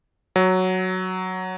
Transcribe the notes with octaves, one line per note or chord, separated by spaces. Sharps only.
F#3